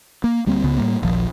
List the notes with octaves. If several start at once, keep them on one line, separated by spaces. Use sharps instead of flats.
A#3
D2 G3 A#3 C4
C#2 C#3 B3
A2 G3 A#3
D#1 A#1 F3